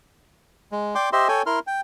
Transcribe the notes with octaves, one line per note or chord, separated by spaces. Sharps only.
G#3
D5 G5 C6 D6
G4 C5 D#5 E5 C6
A4 C#5 G5 G#5
E4 A#4 C6 F6
G5